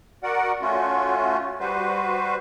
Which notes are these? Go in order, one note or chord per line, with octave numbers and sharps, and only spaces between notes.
F#4 A#4 D5 F#5
A3 C#4 F4 F#4
G3 F#4 B4 C5